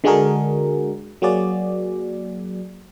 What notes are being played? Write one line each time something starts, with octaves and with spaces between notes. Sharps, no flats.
D3 G#3 D4 F#4 G#4 A#4
F#3 A#3 F#4 G#4 D5